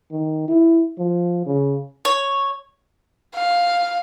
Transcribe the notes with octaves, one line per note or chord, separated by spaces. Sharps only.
D#3
E4
F3
C#3
C#5
F5